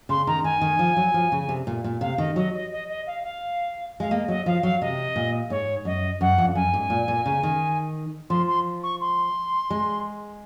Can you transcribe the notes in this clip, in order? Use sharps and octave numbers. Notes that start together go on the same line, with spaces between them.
C#3 C6
D#3 A#5
D#3 G#5
D#3
F3
F#3
F3
C#3
C3
A#2
A#2
C3 F5
D#3 D#5
F#3 D#5
D#5
D#5
D#5
F5
F5
G#3 F5
A#3 D#5
F#3 D#5
F3 F5
F#3 F5
C3 D#5
A#2
G#2 C#5
F#2 D#5
F#2 F#5
F2
F#2 G#5
G#2
A#2
A#2
C#3
D#3
F3 C6
C6
C#6
C6
G#3